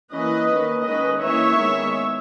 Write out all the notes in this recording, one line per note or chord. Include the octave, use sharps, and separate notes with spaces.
E3 A#3 C#4 B4 D#5
D#3 A#3 C#4
D#3 G#3 C#4 B4 D#5
E3 A#3 C#4 C#5 E5
D#3 G#3 B3